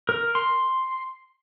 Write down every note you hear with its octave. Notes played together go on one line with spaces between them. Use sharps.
A#4
C6